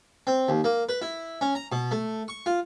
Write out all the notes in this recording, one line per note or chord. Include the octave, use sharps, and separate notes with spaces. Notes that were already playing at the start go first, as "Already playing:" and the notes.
C4
D#2
A#3
B4
E4
C#4
A#5
B2
A3
C#6
F4